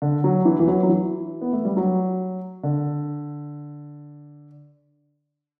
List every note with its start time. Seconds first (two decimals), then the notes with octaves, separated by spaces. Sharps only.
0.02 D3
0.24 F#3
0.45 E3
0.60 E3
0.67 F#3
0.83 F#3
0.89 E3
1.41 B3
1.53 A3
1.65 G3
1.77 F#3
2.63 D3